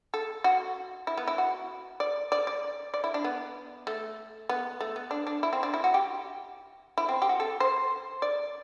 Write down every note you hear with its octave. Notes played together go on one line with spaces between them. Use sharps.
A4
F#4
E4
B3
E4
F#4
D5
D5
D5
D5
E4
D4
B3
A3
B3
A3
B3
D4
D4
E4
C4
D4
E4
F#4
G4
E4
C4
G4
F#4
A4
C5
D5